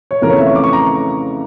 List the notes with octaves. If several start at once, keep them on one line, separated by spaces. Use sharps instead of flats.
C#5
F2 C#3 E3 A3 A#4
C#5
E5
C#6
D6
C#6
A#5